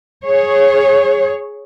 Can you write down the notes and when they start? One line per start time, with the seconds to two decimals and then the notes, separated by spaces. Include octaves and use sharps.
0.24 G#4 C#5